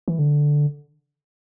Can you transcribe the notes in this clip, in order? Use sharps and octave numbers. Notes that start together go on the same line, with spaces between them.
E3
D3